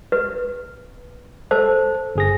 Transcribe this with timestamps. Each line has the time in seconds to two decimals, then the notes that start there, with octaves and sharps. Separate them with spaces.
0.12 B4
1.51 A4 C5
2.16 G1 G#4 A#6